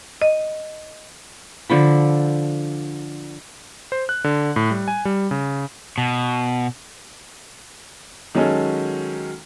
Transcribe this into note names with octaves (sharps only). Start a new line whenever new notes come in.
D#5
D3 F3 B5
C5
F#6
D3
A2
G3
G#5
G3
C#3
B2
D#3 F#3 G#3 C#4 A4